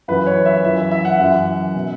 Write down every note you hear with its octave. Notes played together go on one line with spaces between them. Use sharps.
F#2 E3 B4
C#5
E5
F#2 E3 E5
E5
E5
F#5
F#2 E3
B2